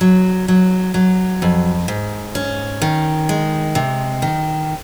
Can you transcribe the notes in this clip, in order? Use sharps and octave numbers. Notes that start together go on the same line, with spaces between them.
F#3
F#3
F#3
F2
G#2
C#4
D#3
G#3
C3
D#3